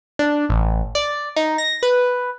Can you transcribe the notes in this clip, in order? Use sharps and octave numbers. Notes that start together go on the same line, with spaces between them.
D4
A1
D5
D#4
A#6
B4